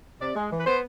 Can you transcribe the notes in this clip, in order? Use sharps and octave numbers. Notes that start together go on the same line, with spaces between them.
C3 D5
G#3
E3
B4
B3 C5